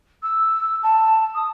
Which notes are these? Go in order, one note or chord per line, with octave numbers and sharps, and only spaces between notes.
E6
A5
D#6